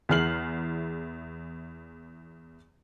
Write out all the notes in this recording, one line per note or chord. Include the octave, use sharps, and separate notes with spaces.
E2 E4 G#4 F6 C7 F#7